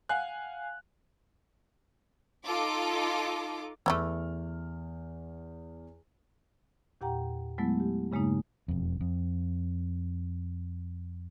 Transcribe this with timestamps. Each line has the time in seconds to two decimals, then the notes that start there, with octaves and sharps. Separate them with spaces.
0.09 F5 F#5 G#5 F#6
2.46 D#4 F4 A4 D6
3.86 E2 E3 F#3 A3 E4 F6
7.01 E2 A#2 G4 F#5 G5 A#5
7.58 F#3 G#3 A3 B3 E4
7.80 G4
8.12 G2 C#3 G#3 A#3 D#4
8.68 E1 F2
9.01 F2